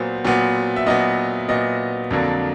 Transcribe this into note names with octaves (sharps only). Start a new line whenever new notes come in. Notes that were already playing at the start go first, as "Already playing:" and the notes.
Already playing: A#2 F#3 B3 C5
A#2 F#3 B3
E5
A#2 F#3 B3 D#5
A#2 F#3 B3 D#5
F2 D3 F#3 A#3 D4